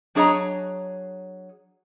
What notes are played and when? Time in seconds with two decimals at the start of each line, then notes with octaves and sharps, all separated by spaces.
0.15 F#3 D4 G#4 C#5 D#5 A#5